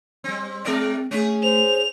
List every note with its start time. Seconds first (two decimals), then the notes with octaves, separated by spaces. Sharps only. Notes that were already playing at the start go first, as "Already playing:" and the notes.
0.24 G3 C4
0.65 G#3 C4 A#4 D5
1.11 A3 C#4 G#4
1.43 C5 F7